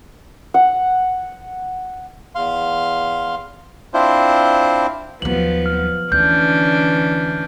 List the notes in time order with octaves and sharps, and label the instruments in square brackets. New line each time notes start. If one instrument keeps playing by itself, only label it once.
[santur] F#5
[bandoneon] E2 F5 C6
C4 D4 E4 F4 C5
[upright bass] D#2 F#3 [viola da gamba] F3 B3 [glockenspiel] F#7
[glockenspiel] F6
[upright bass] D2 [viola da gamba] E3 C#4 D4 [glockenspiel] G6